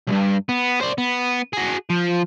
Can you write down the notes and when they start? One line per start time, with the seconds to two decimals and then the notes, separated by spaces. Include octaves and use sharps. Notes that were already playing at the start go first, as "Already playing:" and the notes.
0.07 B1 G2
0.49 B3
0.81 C5 D5
0.98 B3
1.53 F#4 G#4
1.90 F3